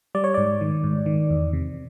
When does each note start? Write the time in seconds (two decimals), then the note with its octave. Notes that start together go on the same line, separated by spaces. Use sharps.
0.15 G3 D5
0.24 C#5
0.34 G#2 D5
0.61 D#3
0.84 G#2
1.06 D#3
1.30 E2
1.53 C3